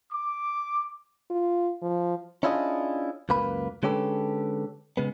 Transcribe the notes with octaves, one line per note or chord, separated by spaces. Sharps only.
D6
F4
F3
C#4 D4 E4 F4 G#4 D#5
C#2 F#2 A#3 B4 B5
D3 G#3 C#4 G4 A4 B4
C#3 G#3 B3